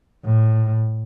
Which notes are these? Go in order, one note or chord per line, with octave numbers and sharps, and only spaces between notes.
A2